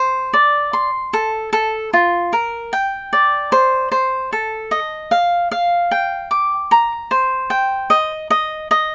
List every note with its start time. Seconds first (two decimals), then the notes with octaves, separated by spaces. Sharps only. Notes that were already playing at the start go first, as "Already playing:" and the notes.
Already playing: C5
0.33 D5
0.73 C6
1.13 A4
1.53 A4
1.93 F4
2.33 A#4
2.73 G5
3.13 D5
3.52 C5
3.92 C5
4.33 A4
4.71 D#5
5.11 F5
5.51 F5
5.91 G5
6.31 D6
6.71 A#5
7.11 C5
7.50 G5
7.90 D#5
8.30 D#5
8.71 D#5